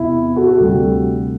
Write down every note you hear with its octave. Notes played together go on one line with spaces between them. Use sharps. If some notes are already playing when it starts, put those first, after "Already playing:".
Already playing: E2 C3 E4
F#4 A4
F#4 A4
D2 C3 G3